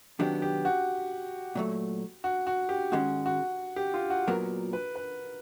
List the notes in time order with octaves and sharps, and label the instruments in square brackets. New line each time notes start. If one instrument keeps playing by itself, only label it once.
[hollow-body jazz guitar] C3 D#3 F#3 B3 D4 [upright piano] G4
[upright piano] G4
F#4
[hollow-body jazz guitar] A#2 F#3 A3
[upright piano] F#4
F#4
G4
[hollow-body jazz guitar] G#2 D#3 G#3 C#4 [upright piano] F#4
[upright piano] F#4
G4
F4
F#4
[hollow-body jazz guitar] A#2 F#3 B3 [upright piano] A#4
[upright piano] B4
B4